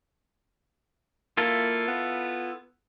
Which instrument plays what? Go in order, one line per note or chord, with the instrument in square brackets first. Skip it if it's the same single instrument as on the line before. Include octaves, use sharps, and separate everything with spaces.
[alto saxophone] A#3 [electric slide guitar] E4 F4 A4
[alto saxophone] B3